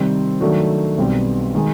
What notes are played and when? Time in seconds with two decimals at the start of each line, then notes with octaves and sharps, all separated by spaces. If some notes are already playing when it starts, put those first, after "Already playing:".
Already playing: C3 D#3 G3 C4
0.41 D#3 F#3 A3 D4 F#4
0.98 B1 B2 G3 C4
1.55 D#3 G#3